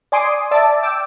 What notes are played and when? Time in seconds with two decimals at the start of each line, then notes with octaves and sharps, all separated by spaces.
0.12 D5 G#5 C6 D6 D#6
0.51 D5 E5 A5 D6
0.83 G5 D6 E6